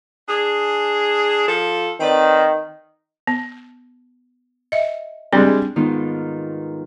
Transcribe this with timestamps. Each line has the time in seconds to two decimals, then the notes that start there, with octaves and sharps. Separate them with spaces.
0.29 D4 G#4
1.48 F3 F4 A4
2.00 D#3 C4 B4 D5
3.27 B3
4.72 D#5 E5
5.33 G3 G#3 C4 D4
5.76 G#2 D#3 B3 D#4 F4